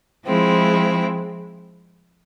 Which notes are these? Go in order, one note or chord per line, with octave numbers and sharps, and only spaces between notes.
F3 G#3 C4 E4